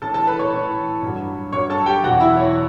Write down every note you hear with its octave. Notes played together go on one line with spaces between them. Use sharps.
A2 E3 A4 A5
A4 A5
B4 B5
C#5 C#6
A2 E3
G2 F#3
G2 F#3 C#5 C#6
A4 A5
G4 G5
E2 B2 F#3 F#4 F#5
E4 E5
C#5